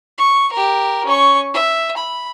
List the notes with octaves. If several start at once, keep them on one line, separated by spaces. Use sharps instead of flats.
C#6
G4 A#4
C#4 C#6
E5
B5